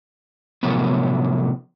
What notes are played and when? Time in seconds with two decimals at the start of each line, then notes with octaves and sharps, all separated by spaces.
0.63 A2 C3 F3 F#3 A#3 B3